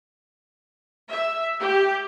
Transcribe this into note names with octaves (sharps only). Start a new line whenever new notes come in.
E5
G4